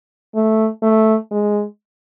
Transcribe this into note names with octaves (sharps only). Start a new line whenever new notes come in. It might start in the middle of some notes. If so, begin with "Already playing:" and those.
A3
A3
G#3